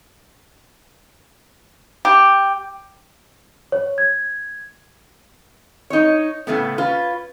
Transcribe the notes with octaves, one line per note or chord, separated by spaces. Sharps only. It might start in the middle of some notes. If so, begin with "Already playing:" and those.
G4
C#5
G#6
D#4 C#5
A2 C#3 A3 B3
C#4 F4 B4